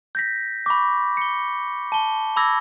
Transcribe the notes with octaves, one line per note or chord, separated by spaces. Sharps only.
G6 A#6 B6
B5 C#6 D6
C#7 G7
A5 G7
B5 D6 E6 G#6 A#6